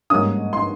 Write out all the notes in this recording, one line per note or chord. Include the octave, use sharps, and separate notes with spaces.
G#2 G3 A#3 C#4 D#6
C6